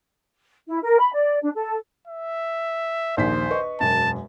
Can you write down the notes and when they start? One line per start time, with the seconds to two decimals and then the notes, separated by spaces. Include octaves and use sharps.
0.65 E4
0.82 A#4
0.99 B5
1.13 D5
1.42 D4
1.53 A4
2.07 E5
3.17 A#1 D#2 C5 B6
3.50 B4 D#5 C#6
3.80 E1 F#2 A5